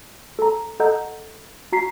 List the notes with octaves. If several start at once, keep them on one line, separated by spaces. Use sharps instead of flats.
A4 A#5
A4 D#5 F#5 A#5 G6
F#4 A#5 B6 C7